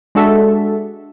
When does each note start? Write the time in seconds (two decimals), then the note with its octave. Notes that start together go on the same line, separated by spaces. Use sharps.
0.15 G#3 D4 F#4 A4 E5